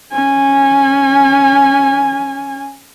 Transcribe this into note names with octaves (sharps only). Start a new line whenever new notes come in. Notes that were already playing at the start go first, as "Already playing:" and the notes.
C#4 G#5